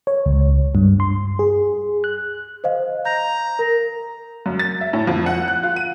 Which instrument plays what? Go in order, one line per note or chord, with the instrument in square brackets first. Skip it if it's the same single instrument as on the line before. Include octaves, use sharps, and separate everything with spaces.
[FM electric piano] C#5
C#2
G2
C6
G#4
F#6
[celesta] C5 D#5 F5
[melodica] A#5 [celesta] G6
[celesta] A#4
[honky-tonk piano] F#2
A6
E5
A2
F2
F#5
F#6
F4
D#7